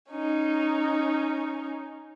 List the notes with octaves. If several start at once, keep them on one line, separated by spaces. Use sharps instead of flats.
C#4 D#4